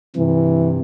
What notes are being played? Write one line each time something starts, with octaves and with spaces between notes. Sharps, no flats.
G2 C3 E3